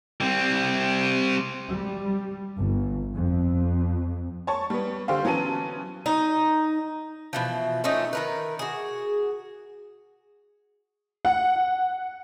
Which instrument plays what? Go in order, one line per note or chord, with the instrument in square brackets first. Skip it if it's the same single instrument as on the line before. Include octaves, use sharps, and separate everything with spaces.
[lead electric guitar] G3 C4
[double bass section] G3
G1
F2
[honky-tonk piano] C#5 A5 C#6
G3 B3
D3 G4 C5 F5
E3 F#3 B3 C#4 A5 D#7
[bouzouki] D#4
B2 E3 F3
F3 A3 C#4 D#4
D#3 A#4 B4
F#4 G#4
[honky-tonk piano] F#5